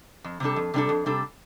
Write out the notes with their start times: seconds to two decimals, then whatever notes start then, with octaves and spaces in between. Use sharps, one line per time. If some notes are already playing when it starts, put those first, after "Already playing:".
0.24 F2
0.40 C3 G3 D4 A4
0.56 F2
0.74 C3 G3 D4 A4
0.89 F2
1.06 C3 G3 D4 A4